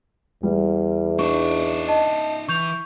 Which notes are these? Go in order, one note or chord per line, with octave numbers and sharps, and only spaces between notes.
E2 G3
D4 D#4 D5 C#6
D#5 A5
E3 C#6 G6 F7